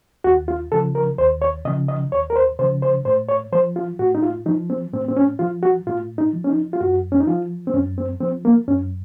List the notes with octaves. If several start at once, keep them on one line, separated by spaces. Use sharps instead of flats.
D#2 F#4
F4
C#3 F3 A4
A#4
D#2 C5
C#5
C#3 F3 D#5
D#5
D#2 C#5
A#4
C5
C#3 F3 C5
C5
A2 C5
C#5
F3 C5
F4
A2 F#4
D#4
F4
F3 D#4
C4
A2 C4
C4
C#4
F3 F4
F#4
A2 F4
D#4
F3
C#4
D#4
F4
F#2 F#4
C#4
D#4
F3 F4
C4
F#2 C#4
C4
F3 C4
A#3
F#2 C#4